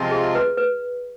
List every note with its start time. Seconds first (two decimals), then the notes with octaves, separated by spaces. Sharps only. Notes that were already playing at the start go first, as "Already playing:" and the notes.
Already playing: C3 F3 G#3 C4 F4
0.11 G#4
0.35 B4
0.58 B4